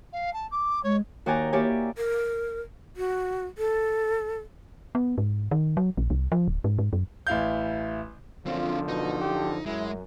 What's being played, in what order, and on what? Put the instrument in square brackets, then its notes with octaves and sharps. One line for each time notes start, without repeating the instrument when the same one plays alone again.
[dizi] F5
A5
D6
[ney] G#3 [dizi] C#5
[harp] D#2 F#4 D5 G5 G#5 A#5
A#3 E4 G4 C#5 D5 G#5
[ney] A#4
F#4
A4
[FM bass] B3
G#2
D#3
F#3
A#1
C2
F3
D1
G#2
G#2
F#2
[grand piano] A1 E4 F5 G6
[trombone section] F#2 D3 F3 [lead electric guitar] C4 D4 [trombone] F4
[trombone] B2 [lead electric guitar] D#4
[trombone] G4
[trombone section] F#2 [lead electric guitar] G#3 [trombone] E4